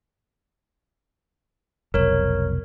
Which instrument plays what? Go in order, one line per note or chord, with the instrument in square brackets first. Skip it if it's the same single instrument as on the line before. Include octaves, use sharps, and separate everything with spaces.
[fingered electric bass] F1 B1 [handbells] A#4 C#5